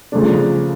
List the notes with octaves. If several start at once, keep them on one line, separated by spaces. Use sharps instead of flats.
C#3 F3 A3 D4